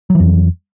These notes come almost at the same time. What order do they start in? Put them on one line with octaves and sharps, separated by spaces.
F#3 E3 F2